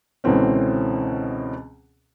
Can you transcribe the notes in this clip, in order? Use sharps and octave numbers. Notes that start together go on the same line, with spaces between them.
C#2 B2 D3 E3 C4 C#4